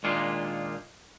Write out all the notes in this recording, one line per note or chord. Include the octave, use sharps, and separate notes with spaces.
A#2 D#3 G#3 A#3 D4 F4